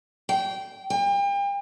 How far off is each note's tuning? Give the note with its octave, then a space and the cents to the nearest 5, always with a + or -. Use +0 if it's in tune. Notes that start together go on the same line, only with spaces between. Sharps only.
G5 -15
G5 +40